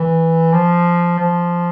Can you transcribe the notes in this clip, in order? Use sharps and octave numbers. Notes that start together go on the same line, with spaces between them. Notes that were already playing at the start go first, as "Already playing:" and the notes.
Already playing: E3
F3
F3